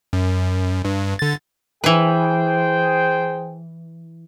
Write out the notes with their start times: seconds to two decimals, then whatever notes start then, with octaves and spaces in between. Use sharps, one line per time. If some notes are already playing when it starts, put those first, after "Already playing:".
0.13 F#2
0.85 G2
1.19 D3 A6
1.84 E3 G#4 B4 C5 G5